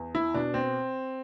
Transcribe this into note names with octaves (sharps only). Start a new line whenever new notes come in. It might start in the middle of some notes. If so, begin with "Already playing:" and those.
Already playing: E2
E4
B2 D4
C4